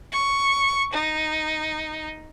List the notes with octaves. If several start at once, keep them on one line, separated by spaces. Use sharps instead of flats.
C#6
D#4